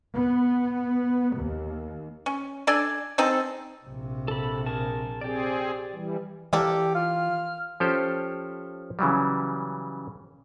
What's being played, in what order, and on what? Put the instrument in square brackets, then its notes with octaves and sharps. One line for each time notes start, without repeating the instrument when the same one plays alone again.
[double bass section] B3
D#2
[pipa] C#4
D4 A4 D5 G#5
C4 D#4 G#4 A4
[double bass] A#1 C3
[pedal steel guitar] A4 B5
G#4 A#4 A5
[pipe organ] C4 G#4 [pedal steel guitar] G4 D5
[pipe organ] E3 G3
[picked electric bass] E3 [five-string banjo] A#3 A4 D5 [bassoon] G4
[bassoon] F4 [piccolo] F6
[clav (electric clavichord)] F3 C#4 G4 A4 C5
C#3 E3 F#3 G3